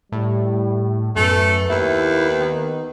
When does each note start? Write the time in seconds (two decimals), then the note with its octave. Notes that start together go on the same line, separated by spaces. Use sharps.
0.12 A2 G3
1.16 F#2 A3 B3
1.70 D#2 E4
2.41 D#3